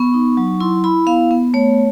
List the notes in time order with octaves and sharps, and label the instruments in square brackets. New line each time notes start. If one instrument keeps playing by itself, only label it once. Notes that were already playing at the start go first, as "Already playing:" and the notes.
Already playing: [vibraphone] B3 C#6
D#4
F#3
E4 C6
E4 B5
B3 F5
B3
A3 C#5